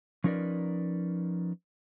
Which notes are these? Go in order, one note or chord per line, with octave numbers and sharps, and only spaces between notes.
F3 C#4 D#4 A#4 B4 D5